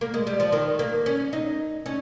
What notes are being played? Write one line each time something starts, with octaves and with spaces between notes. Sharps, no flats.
A#3
G#3
G3
F3
D#3
A#3
C#4
D#4
C#4